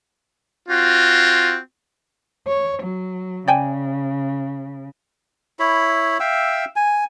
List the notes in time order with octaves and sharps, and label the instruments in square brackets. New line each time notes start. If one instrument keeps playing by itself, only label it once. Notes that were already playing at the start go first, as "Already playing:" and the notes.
[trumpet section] C4 F4 F#4
[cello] C#5
F#3
[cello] C#3 [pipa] D5 G5 G#5
[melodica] E4 C#5 B5
E5 F5 G5 E6
G#5